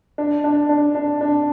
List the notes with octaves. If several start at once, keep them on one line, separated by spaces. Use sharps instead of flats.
D4
D4
D4
D4
D4